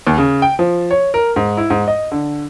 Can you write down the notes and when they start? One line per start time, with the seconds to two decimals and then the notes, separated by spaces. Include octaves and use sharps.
0.07 D#2
0.18 C#3
0.42 G5
0.59 F3
0.91 C#5
1.14 A#4
1.36 G#2
1.57 E4
1.70 G#2
1.88 D#5
2.12 D3